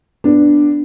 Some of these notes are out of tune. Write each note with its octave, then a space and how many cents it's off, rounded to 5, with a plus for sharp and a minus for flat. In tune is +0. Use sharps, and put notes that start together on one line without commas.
B3 +0 D4 +0